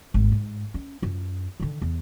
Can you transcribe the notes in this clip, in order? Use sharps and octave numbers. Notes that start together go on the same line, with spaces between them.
D#1 G#1
G#2
C#4
F#2 F4
D3 D#3
E2